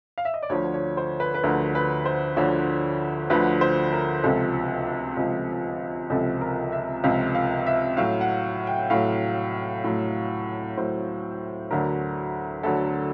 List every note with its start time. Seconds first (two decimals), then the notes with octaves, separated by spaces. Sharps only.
0.18 F5
0.25 E5
0.34 D#5
0.42 D5
0.49 D2 D3 F3 C#5
0.74 C#5
0.97 C5
1.20 B4
1.34 B4
1.43 D2 D3 F3 A#4
1.75 B4
2.05 C5
2.36 D2 D3 F3 C#5
3.30 D2 D3 F3 B4
3.61 C5
3.93 A#4
4.23 C#2 C3 F3 A4
5.17 C#2 C3 F3
6.10 C#2 C3 F3 A4
6.41 A#4
6.72 E5
7.04 C#2 C3 F3 F5
7.35 F5
7.67 E5
7.97 A2 F#3 F5
8.21 F#5
8.67 G5
8.90 A2 F#3 F5
9.84 A2 F#3
10.77 A2 F#3 C5
11.71 D2 D3 F#3 A#4
12.63 D2 D3 F#3 A4